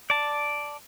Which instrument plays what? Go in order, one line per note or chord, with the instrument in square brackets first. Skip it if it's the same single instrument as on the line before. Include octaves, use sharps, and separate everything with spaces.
[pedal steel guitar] D5 A5